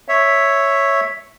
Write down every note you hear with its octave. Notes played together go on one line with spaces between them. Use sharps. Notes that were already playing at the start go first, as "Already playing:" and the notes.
C#5 E5